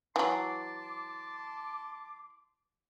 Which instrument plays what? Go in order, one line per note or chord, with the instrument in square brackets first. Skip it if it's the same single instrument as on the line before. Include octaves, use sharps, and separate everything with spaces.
[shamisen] E3 F#3 [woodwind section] A5 C6 D6